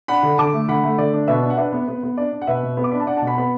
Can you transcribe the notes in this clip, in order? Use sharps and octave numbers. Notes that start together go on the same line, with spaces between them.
D4 F#5 B5
D3
D3 A5 D6
A3
D3 F#5 B5
A3
D3 D5
D4
B2 B4 E5
D4
F#5
D4 B4 E5
B3
B3 B4
B3
D4 D5
D4
F#5
B2 B4 E5
B2
B3
D6
D4 B5
A5
D4 D5 F#5
B2 A5
F#5 B5
B3 B5